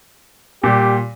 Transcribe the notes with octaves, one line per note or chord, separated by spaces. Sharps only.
A#2 G3 G4